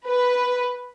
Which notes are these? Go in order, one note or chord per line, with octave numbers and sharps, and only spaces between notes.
B4